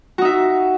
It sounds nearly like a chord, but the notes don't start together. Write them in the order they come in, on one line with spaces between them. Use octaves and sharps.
F#4 D#4 E5